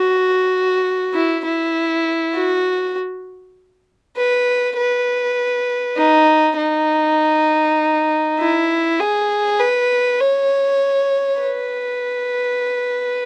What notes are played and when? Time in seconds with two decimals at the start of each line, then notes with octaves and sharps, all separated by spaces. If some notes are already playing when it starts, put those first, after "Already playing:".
Already playing: F#4
1.14 E4
1.45 E4
2.34 F#4
4.17 B4
4.77 B4
5.97 D#4
6.57 D#4
8.38 E4
8.99 G#4
9.59 B4
10.20 C#5
11.41 B4